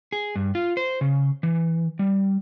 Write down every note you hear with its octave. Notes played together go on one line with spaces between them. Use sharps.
G#4
G2
F4
C5
C#3
E3
G3